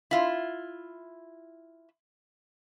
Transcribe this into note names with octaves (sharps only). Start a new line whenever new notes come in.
E4 F4